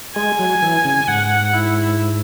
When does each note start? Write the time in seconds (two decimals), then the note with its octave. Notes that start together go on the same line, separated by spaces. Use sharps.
0.16 G#3 G#5
0.39 F#3
0.62 E3
0.85 C#3
1.07 G#2 F#5
1.53 E4